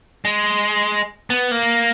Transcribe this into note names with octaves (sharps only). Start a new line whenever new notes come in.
G#3
B3
A#3